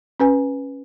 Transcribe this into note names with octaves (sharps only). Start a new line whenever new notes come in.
C#4 B4 G#5